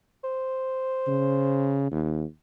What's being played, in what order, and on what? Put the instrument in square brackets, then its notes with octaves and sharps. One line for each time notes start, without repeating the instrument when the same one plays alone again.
[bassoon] C5
[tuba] C#3
D#2